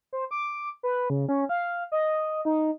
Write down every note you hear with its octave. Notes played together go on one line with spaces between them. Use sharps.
C5
D6
B4
C#3
C#4
F5
D#5
D#4